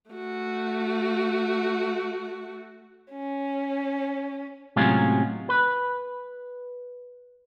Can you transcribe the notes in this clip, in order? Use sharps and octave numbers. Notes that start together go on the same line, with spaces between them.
A3 F#4
C#4
A2 C3 F#3 G#3 C#4 F4
B4